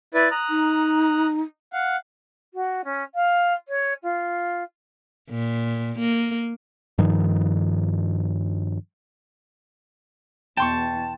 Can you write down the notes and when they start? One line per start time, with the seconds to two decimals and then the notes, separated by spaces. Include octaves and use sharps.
0.14 E4 B4 D5
0.31 A#5 D#6 F#6
0.50 D#4
1.73 F5 F#5
2.54 F#4
2.84 C#4
3.15 F5
3.68 C#5
4.03 F4
5.30 A#2
5.99 A#3
6.98 G2 D#3 F3
10.57 E2 B2 G5 A5 C6 C#6